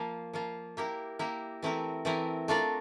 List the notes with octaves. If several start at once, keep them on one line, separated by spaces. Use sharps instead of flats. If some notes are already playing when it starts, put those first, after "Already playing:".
Already playing: F3 A#3 F4
F3 A#3 F4
A#3 E4 G4 A#4
A#3 E4 G4 A#4
E3 A3 C4 E4 A#4
E3 A3 C4 E4 A#4
A3 D4 F4 A#4 D5